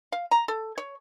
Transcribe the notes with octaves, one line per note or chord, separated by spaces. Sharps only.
F5
A#5
A4
C#5